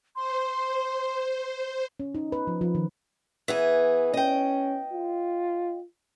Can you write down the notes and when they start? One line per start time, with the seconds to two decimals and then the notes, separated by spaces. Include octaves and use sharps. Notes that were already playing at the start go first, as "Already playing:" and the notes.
0.16 C5 C6
2.00 C#4
2.15 D#4
2.32 B4
2.47 F3
2.61 F3
2.75 D#3
3.48 E3 B3 G#4
4.14 C#4 D#5 G5
4.92 F4